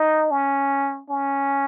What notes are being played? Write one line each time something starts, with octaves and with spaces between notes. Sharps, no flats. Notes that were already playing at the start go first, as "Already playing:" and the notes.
Already playing: D#4
C#4
C#4